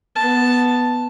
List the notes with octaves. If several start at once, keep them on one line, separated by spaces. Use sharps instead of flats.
B3 A5